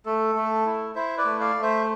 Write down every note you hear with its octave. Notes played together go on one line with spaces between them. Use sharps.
A3 A4
A3
E4
E4 C5 E5
B4 D5
A3
D5 F5
A3
C5 E5